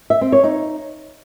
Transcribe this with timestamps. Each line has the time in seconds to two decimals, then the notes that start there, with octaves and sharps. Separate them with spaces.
0.10 E5
0.21 C4
0.32 C#5
0.44 D#4